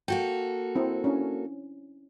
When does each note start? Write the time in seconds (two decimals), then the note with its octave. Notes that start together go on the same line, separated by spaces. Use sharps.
0.08 A#3 F#4 A4 G5
0.76 C4 E4
1.04 C#4 D4 E4